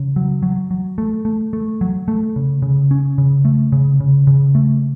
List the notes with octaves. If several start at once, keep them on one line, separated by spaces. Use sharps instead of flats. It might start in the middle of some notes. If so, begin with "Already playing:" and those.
Already playing: C#3
F#3
F#3
F#3
A3
A3
A3
F#3
A3
C#3
C#3
C#4
C#3
A3
C#3
C#3
C#3
A3